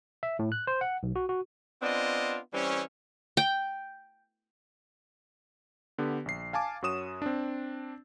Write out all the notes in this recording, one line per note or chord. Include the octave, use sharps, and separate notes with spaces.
E5
A2
F#6
C5
F#5
B1
F#4
F#4
B3 C4 D4 F4 D#5
E3 G3 C4 C#4
G5
D3 B3 G4
A#1 C7
F5 G#5 A5 D6
F#2 F#4 C#5 D#6 E7
C4 D4